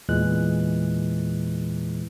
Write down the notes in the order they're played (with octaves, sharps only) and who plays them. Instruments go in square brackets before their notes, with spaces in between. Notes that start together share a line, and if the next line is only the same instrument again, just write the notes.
[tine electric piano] E2 A#2 E3 G#3 F#6